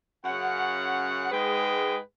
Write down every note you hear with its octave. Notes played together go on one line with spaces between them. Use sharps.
F#2 C#3 F#5
G#2 G#3 G#4 B4 G5